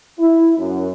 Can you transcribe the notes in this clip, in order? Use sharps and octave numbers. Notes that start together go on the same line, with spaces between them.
E4
F#2